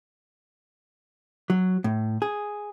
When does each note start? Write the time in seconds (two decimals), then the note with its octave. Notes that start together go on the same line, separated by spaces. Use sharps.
1.50 F#3
1.84 A2
2.22 G#4